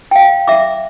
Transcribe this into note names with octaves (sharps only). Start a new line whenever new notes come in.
F5 G5
E5 D6